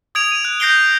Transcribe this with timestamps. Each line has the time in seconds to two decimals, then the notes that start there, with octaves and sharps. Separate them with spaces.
0.15 D#6 G#6 D7 F7
0.32 D#7 F7
0.45 F#6
0.60 G6 A#6 C7 D7 G7